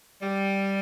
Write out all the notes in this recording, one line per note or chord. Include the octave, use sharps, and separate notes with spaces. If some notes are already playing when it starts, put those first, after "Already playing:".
G3